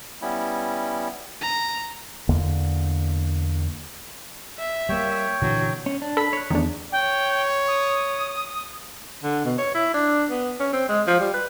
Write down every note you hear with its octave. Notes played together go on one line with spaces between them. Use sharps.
G3 B3 C#4 E4
A#5
E2 D3 A#3
E5
G3 A#3 C#5 G5
A#2 D3 E3 F#3
C#4
D4
A4 B5 B6
C#5 F#6
E2 D#3 A3 D4
C#5 G5
D#6
D3
B2
C#5
E4
D4
B3
C#4
C4
G#3
F3
G3
B4